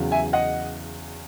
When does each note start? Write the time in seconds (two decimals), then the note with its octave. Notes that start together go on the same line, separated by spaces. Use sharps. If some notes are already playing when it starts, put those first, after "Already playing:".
Already playing: E2 C#3 F#3
0.12 E5 G#5
0.33 D#5 F#5